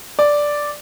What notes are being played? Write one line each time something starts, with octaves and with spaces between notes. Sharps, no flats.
D5